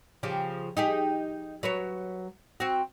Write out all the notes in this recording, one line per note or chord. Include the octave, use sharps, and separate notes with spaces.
C#3 F3 G4
D#4 G4 G#4
F#3 B4 C#5
C4 F#4